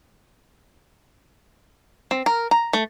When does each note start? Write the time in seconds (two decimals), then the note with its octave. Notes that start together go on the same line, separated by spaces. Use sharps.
2.11 C4
2.26 A#4
2.51 A#5
2.73 A3